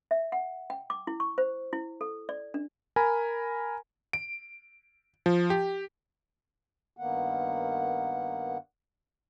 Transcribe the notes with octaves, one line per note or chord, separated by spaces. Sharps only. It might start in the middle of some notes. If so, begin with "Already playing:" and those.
E5
F#5
G5
D6
E4
C#6
C5
E4
A4
D5
D4
A#4 G#5 A#5 B5
D7
F3
G4
G2 D#3 A#3 B3 F#5